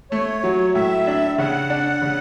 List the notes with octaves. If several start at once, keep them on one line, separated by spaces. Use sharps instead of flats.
A3 C#5
F#3
A2 E5
D4
C#3 F#5
D4
C#3